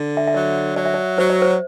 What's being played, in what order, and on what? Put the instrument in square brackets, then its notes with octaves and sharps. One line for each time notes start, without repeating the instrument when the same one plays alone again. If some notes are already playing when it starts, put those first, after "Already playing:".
Already playing: [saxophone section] D3
[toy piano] E5
E5
[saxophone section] F#3 [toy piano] D5
[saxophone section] F#3 [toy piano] D5
[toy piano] E5
D5
[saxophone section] F#3 [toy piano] C5
[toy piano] D5
C5